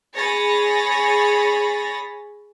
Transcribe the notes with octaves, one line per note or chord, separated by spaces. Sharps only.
G#4 C#5 B5 A6 A#6